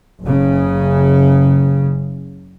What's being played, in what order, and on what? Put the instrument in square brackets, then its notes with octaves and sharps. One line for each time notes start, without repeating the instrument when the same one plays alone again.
[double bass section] F#1 C#3